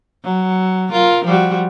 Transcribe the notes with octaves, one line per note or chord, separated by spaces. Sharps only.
F#3
F4 A#4
F3 G3 F#4